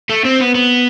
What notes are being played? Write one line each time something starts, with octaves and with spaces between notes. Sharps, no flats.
A3
C4
B3
B3